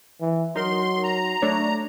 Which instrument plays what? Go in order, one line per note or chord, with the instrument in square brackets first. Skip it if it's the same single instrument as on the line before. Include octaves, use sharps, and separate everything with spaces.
[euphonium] E3
[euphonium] F#3 [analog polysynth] D#4 A#4 [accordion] C6
[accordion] A#5
[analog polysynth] A3 D4 C#5